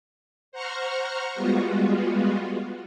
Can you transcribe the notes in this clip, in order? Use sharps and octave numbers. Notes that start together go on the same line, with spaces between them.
C5 F#5 A#5 C#6 F6
G3 G#3 B3 F4 F#4